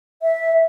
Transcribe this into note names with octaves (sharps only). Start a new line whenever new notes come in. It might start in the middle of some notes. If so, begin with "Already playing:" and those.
E5